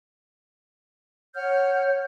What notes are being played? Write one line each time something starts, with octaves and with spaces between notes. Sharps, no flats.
C#5 F#5 F6 G6